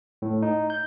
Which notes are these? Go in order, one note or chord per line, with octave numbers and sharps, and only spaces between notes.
A2
D#4
G6